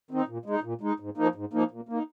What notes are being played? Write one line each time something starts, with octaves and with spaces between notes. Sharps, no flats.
D#3 C4 D#4
A#2
G#3 D#4
A#2
G#3 D#4
G#2
F3 A#3 D#4
G#2
F3 A#3 D#4
A#2
A#3 D#4